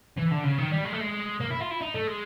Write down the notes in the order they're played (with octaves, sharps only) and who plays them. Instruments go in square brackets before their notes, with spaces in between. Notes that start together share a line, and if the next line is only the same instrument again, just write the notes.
[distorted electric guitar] E3
D3
C#3
D#3
G3
G#3
A3
G#3
A#3
E4
F4
E4
D#4
A3
G#3